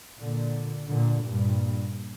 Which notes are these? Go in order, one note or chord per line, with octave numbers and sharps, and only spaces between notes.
A#2 D3
A#2 D3
G2 A#2